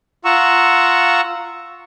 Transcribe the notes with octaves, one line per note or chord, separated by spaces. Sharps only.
F4 F#5 A#5 C#6 E6